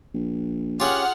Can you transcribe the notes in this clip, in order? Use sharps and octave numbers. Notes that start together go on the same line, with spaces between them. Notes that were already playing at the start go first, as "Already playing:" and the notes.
A#1
C#4 F4 G4 G#4 F#5 F6